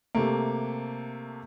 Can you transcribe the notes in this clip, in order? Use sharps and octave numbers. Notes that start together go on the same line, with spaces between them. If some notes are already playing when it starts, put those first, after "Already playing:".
C3 A3 A#3